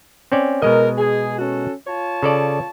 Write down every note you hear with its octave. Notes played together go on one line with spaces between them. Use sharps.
C4 C#4 D5
B2 G#3 A#4 D#5
G#4
C#4 F#4 A4
F4 C#5 A5
C#3 A4 D5